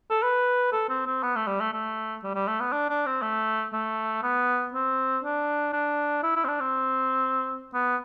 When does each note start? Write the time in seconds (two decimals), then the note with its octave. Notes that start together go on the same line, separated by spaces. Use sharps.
0.10 A4
0.23 B4
0.72 A4
0.89 C4
1.06 C4
1.23 B3
1.36 A3
1.47 G3
1.60 A3
1.72 A3
2.23 G3
2.35 G3
2.48 A3
2.60 B3
2.72 D4
2.89 D4
3.06 C4
3.22 A3
3.73 A3
4.23 B3
4.74 C4
5.24 D4
5.73 D4
6.23 E4
6.36 E4
6.45 C4
6.48 D4
6.60 C4
7.74 B3